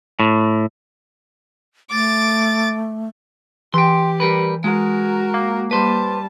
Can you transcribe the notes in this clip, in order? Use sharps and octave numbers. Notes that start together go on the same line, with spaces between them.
A2
A3 D6 A6
E3 G4 G5 C6
G3 A#4 B4
G#3 F#4 A#4
A#3
G3 B4 C5 A5